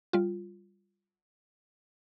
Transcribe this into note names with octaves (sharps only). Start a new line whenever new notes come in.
G3 F4